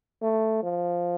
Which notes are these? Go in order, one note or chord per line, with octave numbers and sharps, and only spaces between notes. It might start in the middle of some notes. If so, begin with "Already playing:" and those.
A3
F3